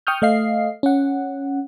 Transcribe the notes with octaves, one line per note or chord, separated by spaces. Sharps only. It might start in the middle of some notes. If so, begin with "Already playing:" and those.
G5 C#6 D#6 F6 G6
A3 D#5 F5 C7
C#4 F#5